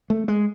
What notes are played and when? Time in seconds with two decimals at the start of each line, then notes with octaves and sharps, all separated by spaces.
0.10 A3
0.28 G#3